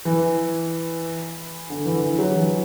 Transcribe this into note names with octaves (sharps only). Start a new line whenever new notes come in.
E3
D3
E3
E3
F#3
E3